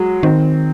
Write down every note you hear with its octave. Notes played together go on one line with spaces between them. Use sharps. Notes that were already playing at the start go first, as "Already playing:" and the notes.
Already playing: F#3 G#3
D#3 C4